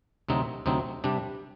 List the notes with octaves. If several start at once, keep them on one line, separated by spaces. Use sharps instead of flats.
D2 C3 F#3 C4 D#4
D2 C3 F#3 C4 D#4
C3 G3 D4